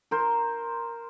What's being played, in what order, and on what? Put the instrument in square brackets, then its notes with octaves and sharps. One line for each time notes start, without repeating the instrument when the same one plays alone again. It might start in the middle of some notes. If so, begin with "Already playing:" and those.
[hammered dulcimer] A#4 C5